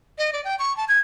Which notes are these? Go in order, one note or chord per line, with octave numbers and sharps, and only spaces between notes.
D#5
D5
G5
C#6
A5
G#6